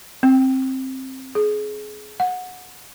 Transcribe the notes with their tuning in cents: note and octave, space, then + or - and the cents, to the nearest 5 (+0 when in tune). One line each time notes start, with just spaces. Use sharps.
C4 +10
G#4 +25
F#5 -20